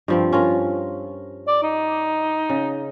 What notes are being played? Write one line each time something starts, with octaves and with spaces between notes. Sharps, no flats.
G2 F3 C4
C#4 F4 A#4
D5
D#4
C#3